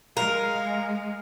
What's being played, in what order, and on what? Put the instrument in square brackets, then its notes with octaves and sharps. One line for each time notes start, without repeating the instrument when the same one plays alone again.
[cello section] G#3 [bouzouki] A#4 [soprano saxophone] F5